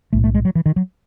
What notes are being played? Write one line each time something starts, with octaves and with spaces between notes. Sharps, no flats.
B1 A2 A3
A3
G#3
F#3
E3
D#3
F#3